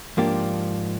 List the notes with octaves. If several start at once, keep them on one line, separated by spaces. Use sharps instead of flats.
G#2 F3 A#3 D4 G4